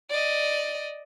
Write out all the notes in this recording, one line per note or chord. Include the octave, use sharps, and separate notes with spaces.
D5 D#5